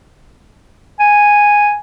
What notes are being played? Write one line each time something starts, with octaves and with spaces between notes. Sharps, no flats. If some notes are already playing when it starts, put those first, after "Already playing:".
G#5